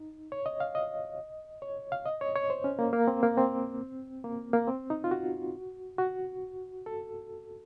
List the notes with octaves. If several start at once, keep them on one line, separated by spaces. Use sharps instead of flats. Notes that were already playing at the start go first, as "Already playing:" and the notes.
Already playing: D#4
C#5
D#5
F5
D#5
C#5
F5
D#5
C#5
C#5
C5
C#4
A#3
A#3
C4
A#3
C4
A#3
A#3
C4
D#4
F4
F#4
F#4
A4